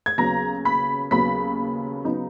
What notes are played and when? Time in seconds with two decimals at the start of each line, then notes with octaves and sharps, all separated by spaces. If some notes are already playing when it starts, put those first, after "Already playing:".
0.06 G#6
0.18 D#2 C#3 F#3 B3 A#5 A#6
0.65 B5 B6
1.11 D#2 C#3 F#3 B3 B5 B6
2.05 C#3 F#3 B3 D#4